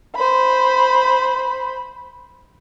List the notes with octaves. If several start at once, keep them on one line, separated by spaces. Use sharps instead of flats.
C5 B5